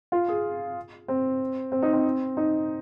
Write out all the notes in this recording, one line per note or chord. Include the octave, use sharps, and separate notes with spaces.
F4
G#4
C4
C4
D#4
C4
D#4